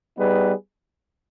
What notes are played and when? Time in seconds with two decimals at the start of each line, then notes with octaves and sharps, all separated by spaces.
0.18 G3 B3 D#4 G#4 B4